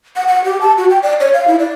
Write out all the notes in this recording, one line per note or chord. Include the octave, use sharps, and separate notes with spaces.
F#5
F#5
G4
A5
F#4
G5
D5
C#5
F5
E4
D5